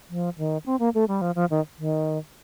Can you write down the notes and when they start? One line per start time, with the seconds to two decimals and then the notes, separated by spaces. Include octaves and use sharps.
0.10 F3
0.38 D#3
0.66 C4
0.79 A#3
0.95 A3
1.08 G3
1.21 F3
1.35 F3
1.50 D#3
1.78 D#3